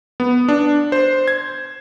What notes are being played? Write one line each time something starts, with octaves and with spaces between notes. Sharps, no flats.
B3
D4
C5
G#6